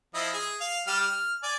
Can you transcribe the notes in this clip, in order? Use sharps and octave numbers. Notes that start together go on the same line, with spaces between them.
F3 E4 D#5
G#4
F5
G3 G4 F6
F6
D5 G#5